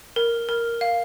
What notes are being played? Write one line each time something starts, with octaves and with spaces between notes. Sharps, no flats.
A#4
A#4
F5